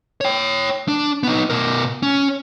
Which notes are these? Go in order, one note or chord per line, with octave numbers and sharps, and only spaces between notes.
C#5 G5
D4
B3 D#4
B2 A#4
C#4